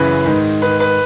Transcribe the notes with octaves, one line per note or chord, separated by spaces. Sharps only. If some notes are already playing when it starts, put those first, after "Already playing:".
Already playing: F#2 C#3 E3 B4
G#2 D#3
G#2 D#3 B4
B4